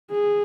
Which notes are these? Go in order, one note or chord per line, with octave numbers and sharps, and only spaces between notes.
G#4